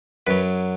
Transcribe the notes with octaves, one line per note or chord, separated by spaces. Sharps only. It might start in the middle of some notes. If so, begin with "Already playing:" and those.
F#2 F#3 B4